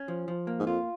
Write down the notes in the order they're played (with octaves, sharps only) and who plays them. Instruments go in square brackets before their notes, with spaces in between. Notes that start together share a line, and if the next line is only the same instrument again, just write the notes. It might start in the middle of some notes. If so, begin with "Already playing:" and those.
Already playing: [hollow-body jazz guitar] C#4
F3
F3
A#3
[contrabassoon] G#2
[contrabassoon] F2 [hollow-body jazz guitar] F4